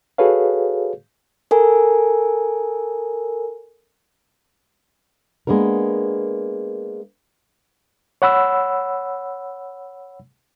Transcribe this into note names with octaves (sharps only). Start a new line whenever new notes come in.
F#4 G#4 A4 B4 C#5 F5
A4 A#4 G#5
G#3 A#3 B3 D4 A#4
C#5 F#5 B5 E6